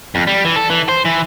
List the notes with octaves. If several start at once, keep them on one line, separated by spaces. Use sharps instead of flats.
F2
G3
E3
A4
E3
C5
E3